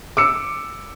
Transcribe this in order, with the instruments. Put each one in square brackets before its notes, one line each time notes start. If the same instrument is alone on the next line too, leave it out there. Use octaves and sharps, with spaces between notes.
[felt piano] D6 E6 C#7